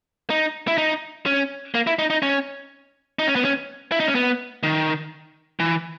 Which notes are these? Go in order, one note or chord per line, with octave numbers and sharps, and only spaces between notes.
D#4
E4
D#4
C#4
A#3
E4
D#4
D#4
C#4
D#4
C#4
B3
C#4
E4
D#4
C#4
B3
D#3
E3